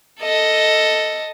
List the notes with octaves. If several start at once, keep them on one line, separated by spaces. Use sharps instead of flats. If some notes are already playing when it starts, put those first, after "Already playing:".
A4 D#5